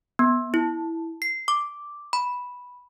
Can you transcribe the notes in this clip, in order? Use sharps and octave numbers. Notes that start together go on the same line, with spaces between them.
B3
E4
C7
D6
B5